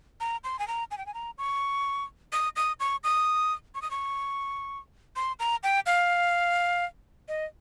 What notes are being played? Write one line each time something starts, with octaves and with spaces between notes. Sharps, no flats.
A#5
C6
G#5
A#5
G#5
G5
G#5
A#5
C#6
D#6
D#6
C#6
D#6
C#6
D#6
C#6
C6
A#5
G5
F5
D#5